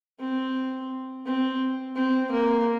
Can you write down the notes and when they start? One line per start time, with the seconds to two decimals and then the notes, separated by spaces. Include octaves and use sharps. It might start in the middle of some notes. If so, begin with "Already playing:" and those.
0.19 C4
1.26 C4
1.96 C4
2.31 A#3